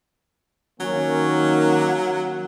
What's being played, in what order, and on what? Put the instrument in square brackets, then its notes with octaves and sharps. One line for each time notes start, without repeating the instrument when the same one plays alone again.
[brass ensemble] D#3 A#3 C#4 [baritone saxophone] F#3